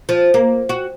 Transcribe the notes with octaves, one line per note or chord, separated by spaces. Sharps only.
F3
A#3
F#4